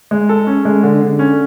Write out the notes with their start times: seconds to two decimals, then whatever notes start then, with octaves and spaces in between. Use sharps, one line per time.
0.11 G#3
0.29 A4
0.47 C#4
0.65 G#3
0.83 D3
1.01 D3
1.19 C#4